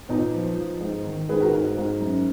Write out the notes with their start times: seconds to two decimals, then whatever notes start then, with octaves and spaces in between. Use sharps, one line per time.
0.09 A#2 B3 D#4
0.33 F3
0.57 F3
0.80 G#2
1.05 D#3
1.29 G#2 G#4 B4
1.40 F#4 A#4
1.53 G#2
1.77 G#2
2.00 F#2